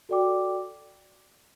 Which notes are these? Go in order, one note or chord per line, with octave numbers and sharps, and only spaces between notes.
F#4 A4 D5 G5 D6